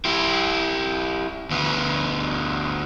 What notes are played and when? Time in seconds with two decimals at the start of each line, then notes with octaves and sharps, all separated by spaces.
0.05 E4 G4
1.51 D2 B3